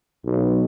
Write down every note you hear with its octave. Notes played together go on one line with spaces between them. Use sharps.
B1